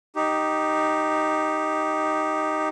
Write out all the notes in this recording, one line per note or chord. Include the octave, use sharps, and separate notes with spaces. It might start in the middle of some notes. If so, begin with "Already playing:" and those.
D#4 G4